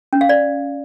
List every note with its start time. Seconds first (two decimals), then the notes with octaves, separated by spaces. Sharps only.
0.13 C#4
0.21 F5
0.29 D5